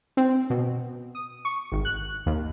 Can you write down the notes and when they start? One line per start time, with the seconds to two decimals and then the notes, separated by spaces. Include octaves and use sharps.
0.17 C4
0.50 B2
1.15 D#6
1.45 C#6
1.72 G#1
1.85 F#6
2.26 D#2